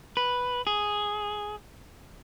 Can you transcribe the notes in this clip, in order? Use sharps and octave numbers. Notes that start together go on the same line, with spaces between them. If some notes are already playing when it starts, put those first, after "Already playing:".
B4
G#4